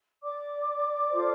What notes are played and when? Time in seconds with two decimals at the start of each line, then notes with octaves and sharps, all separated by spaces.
0.23 D5 D6
1.11 F4 A4 C5